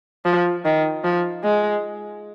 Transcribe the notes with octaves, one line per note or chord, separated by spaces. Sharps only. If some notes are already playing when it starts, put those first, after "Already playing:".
F3
D#3
F3
G#3